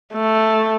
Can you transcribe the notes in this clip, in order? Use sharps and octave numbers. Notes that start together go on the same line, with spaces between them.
A3